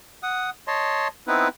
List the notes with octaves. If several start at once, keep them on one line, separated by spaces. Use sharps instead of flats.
F#5 D#6
C#5 D#5 A5 C6
B3 C4 D#4 E4 B4